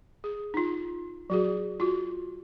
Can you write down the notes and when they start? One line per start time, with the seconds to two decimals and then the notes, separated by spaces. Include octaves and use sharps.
0.24 G#4
0.54 D#4 F4
1.30 F#3 F#4 G#4
1.80 F4 F#4